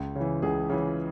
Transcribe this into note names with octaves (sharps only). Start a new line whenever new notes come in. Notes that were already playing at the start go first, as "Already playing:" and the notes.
Already playing: C#2
C#3 E3
C#2 G#4
C#3 E3